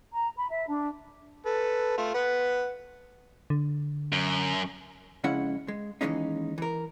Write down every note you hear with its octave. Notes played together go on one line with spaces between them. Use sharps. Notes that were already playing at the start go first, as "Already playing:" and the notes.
A#5
B5
E5
D4
A4 B4
A3 F4
B4 F#5
D3
F#2
F2 C#3 G#3 C#4 E4 F#5
G#3
D#2 B2 E3 G#3 C#4 D#4
E3 A#4